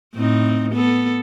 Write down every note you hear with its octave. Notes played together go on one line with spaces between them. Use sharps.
A2 C4 D#4
B3 A4